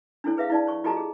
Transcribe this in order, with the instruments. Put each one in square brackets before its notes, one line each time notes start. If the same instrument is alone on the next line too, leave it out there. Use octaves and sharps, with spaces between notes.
[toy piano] D4 E4 A4 C#5
G#4 B4 E5 F5
E4 D5 A5
C#5 C#6
F4 G4 A4 D#5 A5 A#5
G#4